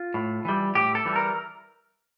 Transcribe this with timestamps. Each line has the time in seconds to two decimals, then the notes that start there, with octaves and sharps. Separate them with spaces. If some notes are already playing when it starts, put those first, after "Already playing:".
Already playing: F4
0.14 A2
0.45 E3 G3
0.75 A2 G4
0.95 A4
1.06 E3 G3
1.16 A#4